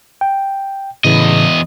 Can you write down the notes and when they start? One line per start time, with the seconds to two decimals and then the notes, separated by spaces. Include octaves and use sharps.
0.21 G5
1.04 E2 A2 C#3 E3 D#5